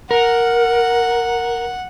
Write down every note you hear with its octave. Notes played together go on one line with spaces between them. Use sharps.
A#4 F#5